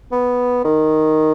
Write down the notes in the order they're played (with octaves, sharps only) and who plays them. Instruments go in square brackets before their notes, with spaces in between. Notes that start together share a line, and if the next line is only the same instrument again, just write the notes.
[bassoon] B3
D#3